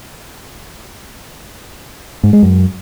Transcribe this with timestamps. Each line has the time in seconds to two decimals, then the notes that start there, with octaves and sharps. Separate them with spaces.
2.23 G#2
2.33 G#3
2.43 F#2